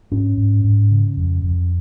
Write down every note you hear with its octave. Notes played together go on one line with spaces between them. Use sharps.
G#2 C#4
G#2
G#2
C#3
F2
F2